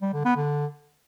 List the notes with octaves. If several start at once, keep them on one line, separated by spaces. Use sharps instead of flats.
G3
D3
B3
D3